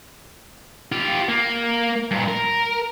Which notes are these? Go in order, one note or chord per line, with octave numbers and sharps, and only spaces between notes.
F4 G4
A#3
G2 A#2
A#4